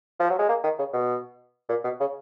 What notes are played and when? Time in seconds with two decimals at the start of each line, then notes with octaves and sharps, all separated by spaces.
0.20 F3
0.30 F#3
0.39 G#3
0.49 A#3
0.64 D#3
0.79 C#3
0.93 B2
1.69 A#2
1.84 B2
2.00 C#3